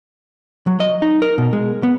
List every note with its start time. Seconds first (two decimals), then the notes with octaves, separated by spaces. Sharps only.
0.67 F#3
0.80 D#5
1.02 D#4
1.22 A#4
1.38 B2
1.53 G#3
1.83 B3